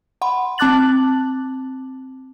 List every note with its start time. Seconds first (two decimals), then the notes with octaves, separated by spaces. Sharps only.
0.22 F#5 B5 C6
0.58 C4 A5 D6 F#6 A6 F#7